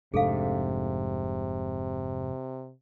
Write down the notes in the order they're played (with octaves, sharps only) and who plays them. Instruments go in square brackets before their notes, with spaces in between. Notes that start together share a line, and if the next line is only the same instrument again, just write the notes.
[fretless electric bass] F1 G#2 D4 [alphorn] C3 [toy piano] G#4 A4 F5